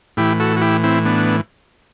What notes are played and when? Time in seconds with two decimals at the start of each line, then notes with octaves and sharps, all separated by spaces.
0.17 A2 E3 E4 G4
0.40 F#4 A4
0.56 F#4
0.62 E4 G4
0.83 C4 E4
1.06 B3 D4